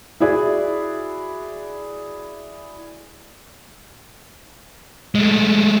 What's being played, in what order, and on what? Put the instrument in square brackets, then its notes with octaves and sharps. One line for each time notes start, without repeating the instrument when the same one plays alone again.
[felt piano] E4 F#4 G#4 D5 E5
[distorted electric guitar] G#3 A3